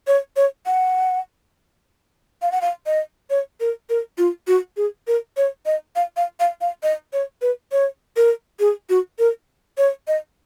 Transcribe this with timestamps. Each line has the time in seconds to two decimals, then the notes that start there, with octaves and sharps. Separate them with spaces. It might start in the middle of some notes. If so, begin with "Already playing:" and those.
0.07 C#5
0.36 C#5
0.66 F#5
2.42 F5
2.52 F#5
2.61 F5
2.86 D#5
3.30 C#5
3.60 A#4
3.90 A#4
4.18 F4
4.48 F#4
4.77 G#4
5.07 A#4
5.37 C#5
5.66 D#5
5.96 F5
6.17 F5
6.40 F5
6.61 F5
6.83 D#5
7.13 C#5
7.42 B4
7.72 C#5
8.16 A#4
8.60 G#4
8.90 F#4
9.19 A#4
9.78 C#5
10.08 D#5